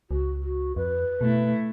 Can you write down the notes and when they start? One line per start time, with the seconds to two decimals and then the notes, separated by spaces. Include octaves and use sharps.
0.11 C#2 F#4
0.43 F#4
0.76 F2 B4
1.21 B2 A3 E4